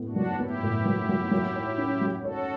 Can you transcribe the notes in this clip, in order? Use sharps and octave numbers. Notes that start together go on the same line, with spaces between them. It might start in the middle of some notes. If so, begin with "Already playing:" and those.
Already playing: A2 B3
D4 F#4
F#3
B3 E4 G4
A2
F#3
F#3
F#3
C#5
C#4
F#3
F#4 A4 C#5